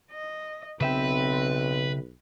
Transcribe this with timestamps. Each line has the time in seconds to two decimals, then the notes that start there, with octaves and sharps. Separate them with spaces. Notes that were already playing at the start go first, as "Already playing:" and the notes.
0.12 D#5
0.81 B1 C#3 C4 B4 E5 G5